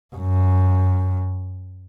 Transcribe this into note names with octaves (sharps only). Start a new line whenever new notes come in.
F#2